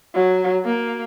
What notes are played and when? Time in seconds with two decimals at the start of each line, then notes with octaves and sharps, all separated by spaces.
0.15 F#3
0.65 A#3